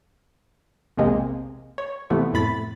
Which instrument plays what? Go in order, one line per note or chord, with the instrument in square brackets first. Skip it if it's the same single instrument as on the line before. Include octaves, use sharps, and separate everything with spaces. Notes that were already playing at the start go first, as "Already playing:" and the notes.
[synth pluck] B1 E2 C3 G#3 A#3 C4
C#5
C3 E3 F3 A3 B3
F2 A2 B5 A6